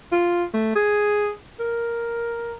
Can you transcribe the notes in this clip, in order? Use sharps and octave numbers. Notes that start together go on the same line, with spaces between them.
F4
A3
G#4
A#4